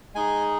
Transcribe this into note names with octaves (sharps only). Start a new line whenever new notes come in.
G#3 D#4 G#4 G#5